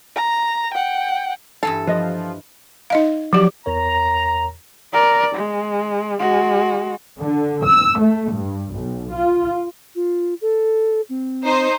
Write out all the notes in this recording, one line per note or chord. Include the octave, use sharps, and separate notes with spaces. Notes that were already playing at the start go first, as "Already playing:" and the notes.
A#5
F#5 G5
G2 E3 A4 F5
F3 B4 D#5
D#4 D#5 F5
F3 F#3 G4 C#5 D5
E2 A#4 C#5 A#5
A#4 D5
G#3
G#3 F#4
D3
E6
A3
G2
B1
F4
F4
A4
C4
D#4 C5